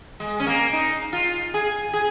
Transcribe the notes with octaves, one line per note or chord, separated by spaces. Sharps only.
G#3
C#4
A#3
D#4
F4
G#4
G#4